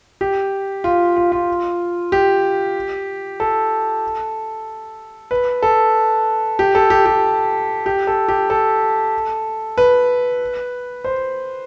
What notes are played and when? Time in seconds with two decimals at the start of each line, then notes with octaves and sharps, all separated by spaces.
0.21 G4
0.84 F4
1.17 F4
1.32 F4
2.12 G4
3.40 A4
5.31 B4
5.63 A4
6.59 G4
6.75 A4
6.90 G4
7.06 G4
7.86 G4
8.07 A4
8.28 G4
8.50 A4
9.78 B4
11.04 C5